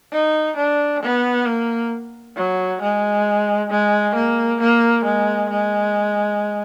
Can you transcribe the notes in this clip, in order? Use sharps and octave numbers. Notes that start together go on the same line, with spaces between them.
D#4
D4
B3
A#3
F#3
G#3
G#3
A#3
A#3
G#3
G#3